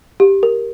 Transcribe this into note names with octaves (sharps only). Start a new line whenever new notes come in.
G4
A#4